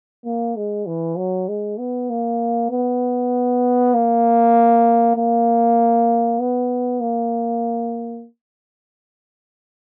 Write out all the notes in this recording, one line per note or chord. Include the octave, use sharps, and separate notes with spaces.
A#3
G#3
E3
F#3
G#3
B3
A#3
B3
A#3
A#3
B3
A#3